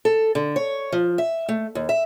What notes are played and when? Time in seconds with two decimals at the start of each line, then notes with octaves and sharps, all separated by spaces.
0.05 A4
0.35 D3
0.56 C#5
0.92 F3
1.18 E5
1.49 A3
1.75 D#2
1.89 E5